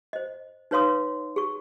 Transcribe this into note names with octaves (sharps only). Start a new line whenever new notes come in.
C5 D#5
D#4 B4 C#5 F5 C6 D#6
G#4 C#6